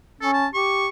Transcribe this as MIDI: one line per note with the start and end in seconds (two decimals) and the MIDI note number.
0.21 0.46 61
0.21 0.32 69
0.33 0.47 81
0.54 0.88 67
0.54 0.88 85